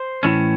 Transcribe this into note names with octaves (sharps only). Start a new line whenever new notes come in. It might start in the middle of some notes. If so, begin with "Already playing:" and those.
Already playing: C5
A2 E3 A3 C#4